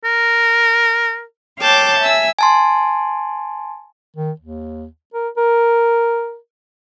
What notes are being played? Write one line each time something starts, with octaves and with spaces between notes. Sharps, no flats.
A#4
C#5 F5 G5 A5 D6 G6
E5 G#5 E6
G#5 A5 C6
D#3
D#2
A#4
A#4